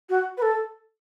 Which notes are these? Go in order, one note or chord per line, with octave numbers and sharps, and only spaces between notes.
F#4
B4
A4